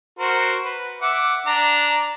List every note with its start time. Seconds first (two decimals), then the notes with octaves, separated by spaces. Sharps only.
0.19 F#4 A#4 C5
0.65 B4
1.02 E5 F#5 D6
1.47 D4 A#5